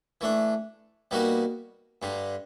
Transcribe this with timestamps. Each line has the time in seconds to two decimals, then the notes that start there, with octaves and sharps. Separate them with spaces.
0.21 E3 A3 D4
1.11 B2 G3 A#3 D#4 F#4
2.02 G2 D3 G3